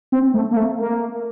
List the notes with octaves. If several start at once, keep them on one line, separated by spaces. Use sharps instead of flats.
C4
A3
A#3
A3
A#3